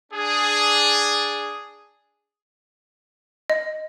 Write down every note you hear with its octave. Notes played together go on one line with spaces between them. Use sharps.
D4 G#4
D#5